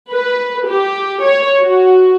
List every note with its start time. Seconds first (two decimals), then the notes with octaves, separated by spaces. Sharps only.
0.11 B4
0.68 G4
1.24 C#5
1.59 F#4